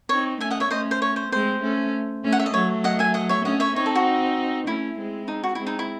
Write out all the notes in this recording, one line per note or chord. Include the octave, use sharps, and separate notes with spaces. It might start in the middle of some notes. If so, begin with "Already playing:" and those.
C4 D#4 C#5
A3 C#4 E5 G#5
D#5 F#5
C#5 E5
A3 C#4 C5 D#5
C5
C#5
C5
G#3 C4 C5
A3 C#4
A3 C#4
F#5
E5
D#5
F#3 A3 C#5
D#5 F#5
E5 G#5
D#5 F#5
C#5 E5
A3 C#4 D#5 F#5
C#5 E5
C4 D#4 C#5
A4
F#4
A3 C#4 E4
G#3 C4
D#4
F#4
G#3 C4 E4
D#4
E4